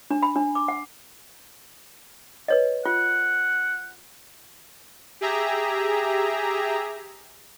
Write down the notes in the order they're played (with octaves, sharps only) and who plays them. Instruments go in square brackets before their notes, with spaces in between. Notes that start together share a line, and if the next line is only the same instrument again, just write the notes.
[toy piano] D4
B5
D4
D6
F#5
B4 C#5 D#5
[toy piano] F4 [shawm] F#5
[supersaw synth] G4 G#4 E5 A#5